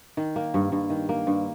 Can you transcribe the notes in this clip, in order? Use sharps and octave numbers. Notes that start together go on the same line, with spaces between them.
D#3
A#3
G2
G2
D#3
A#3
G2